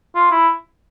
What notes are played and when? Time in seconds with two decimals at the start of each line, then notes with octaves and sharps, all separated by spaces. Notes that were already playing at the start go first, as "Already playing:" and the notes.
0.15 F4
0.31 E4